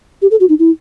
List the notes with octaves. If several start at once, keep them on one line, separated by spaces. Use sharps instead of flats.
G4
A4
F#4
D#4
E4